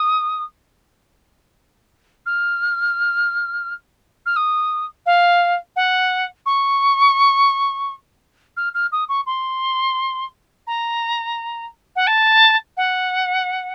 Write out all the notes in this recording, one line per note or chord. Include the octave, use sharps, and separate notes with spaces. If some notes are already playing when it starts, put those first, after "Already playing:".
Already playing: D#6
F6
F6
D#6
F5
F#5
C#6
F6
F6
D#6
C#6
C6
A#5
F#5
A5
F#5